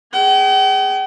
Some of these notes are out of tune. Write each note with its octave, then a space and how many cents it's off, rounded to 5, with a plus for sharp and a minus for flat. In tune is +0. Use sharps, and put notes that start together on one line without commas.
G#4 -10 G5 -45